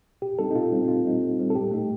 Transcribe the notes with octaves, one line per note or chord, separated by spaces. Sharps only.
A#2 G4
G3 C4 D#4 A4
D#4
A#2 F4
G3 C4 D#4
D#4
A#2 F4
G3 C4 D#4
A#2
G3 C4 D#4
A4
A2 G4
A3 D#4